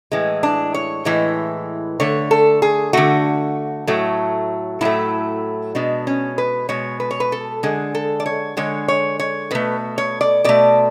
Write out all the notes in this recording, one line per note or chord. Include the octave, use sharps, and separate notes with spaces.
A2 E3 G#3
D4
C#5
A2 E3 G#3
D3 A3 C#5
A4
G#4
D3 A3 F#4
A2 F#3 A3
A2 F#3 A3 E4
B2 G#3 D4
C#4
B4
B2 G#3 C#5
B4
C#5
B4
A4
D3 G#3 G#4
A4
D5
C#5
D3 G#3 C#5
C#5
C#5
B2 A3 B4
C#5
D5
B2 A3 D5